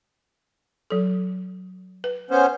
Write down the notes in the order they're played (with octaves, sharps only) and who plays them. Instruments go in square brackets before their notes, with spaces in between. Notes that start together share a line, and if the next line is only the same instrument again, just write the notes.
[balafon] F#3 A4
B4
[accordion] B3 C#4 C5